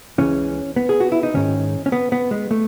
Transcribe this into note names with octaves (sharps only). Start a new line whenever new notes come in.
C#2 C#3 E3 C#4
B3
G#4
F#4
E4
D#4
G#2 D#3 C#4
C#4
B3
B3
G#3
A3